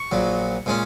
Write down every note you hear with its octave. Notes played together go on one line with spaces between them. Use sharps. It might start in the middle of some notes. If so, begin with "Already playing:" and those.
Already playing: C#6
A#1 A#2 F#3
A#2 G#3 C#4